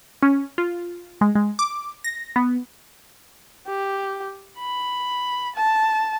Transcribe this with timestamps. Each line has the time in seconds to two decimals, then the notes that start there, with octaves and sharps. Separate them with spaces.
0.23 C#4
0.58 F4
1.21 G#3
1.35 G#3
1.59 D6
2.04 A#6
2.36 B3
3.67 G4
4.58 B5
5.55 A5